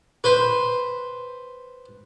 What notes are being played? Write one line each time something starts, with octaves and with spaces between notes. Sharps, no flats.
B4 C5